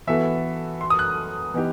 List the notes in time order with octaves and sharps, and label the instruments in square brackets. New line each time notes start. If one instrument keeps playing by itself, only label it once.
[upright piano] E3 B3 F#4 A4 [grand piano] E5
[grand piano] C6
D#6
F#6
[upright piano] E3 B3 D#4 G4